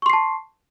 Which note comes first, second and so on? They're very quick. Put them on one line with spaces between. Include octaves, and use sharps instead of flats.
C#6 C6 C7 A5